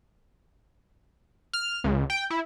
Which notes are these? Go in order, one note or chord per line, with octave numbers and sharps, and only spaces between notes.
F6
C#2
G5
E4